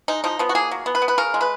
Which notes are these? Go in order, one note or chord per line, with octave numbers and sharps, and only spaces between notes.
G#3 D#4
F3 D#4
F3 B3
F#4
A#3 G#4
F#3
B3
B4
B3
B4
C#3 A#4
G#3
B4